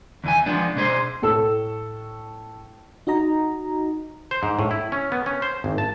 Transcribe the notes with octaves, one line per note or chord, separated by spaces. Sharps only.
E2 E3 G#5
F3 G#3 B3 D4
B2 D4 G#4 B4 C5
A2 A4 E6
D#4 F#4 D#5 A#5
C5
G#2
A2
E4
C#4
B3
C#4
C5
G#1
A5